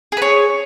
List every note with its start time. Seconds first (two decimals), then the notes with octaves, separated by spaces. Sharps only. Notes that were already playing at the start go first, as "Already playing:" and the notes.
0.12 G#4
0.17 B4
0.22 C#5